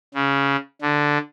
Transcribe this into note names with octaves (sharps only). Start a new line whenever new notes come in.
C#3
D3